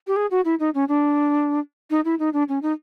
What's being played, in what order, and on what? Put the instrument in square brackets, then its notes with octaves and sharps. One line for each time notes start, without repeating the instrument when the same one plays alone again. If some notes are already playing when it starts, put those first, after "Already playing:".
[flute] G4
G#4
F#4
E4
D#4
C#4
D4
D#4
E4
D#4
D4
C#4
D#4